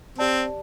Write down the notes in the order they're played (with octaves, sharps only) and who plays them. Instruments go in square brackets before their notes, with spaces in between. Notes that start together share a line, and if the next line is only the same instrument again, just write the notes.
[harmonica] C4 [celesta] G4 D5 A5